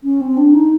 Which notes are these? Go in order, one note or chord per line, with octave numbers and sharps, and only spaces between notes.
C#4
C4
D4
D#4